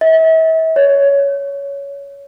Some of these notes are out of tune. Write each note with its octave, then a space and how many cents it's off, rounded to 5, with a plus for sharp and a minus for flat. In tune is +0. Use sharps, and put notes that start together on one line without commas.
E5 -40
C#5 +15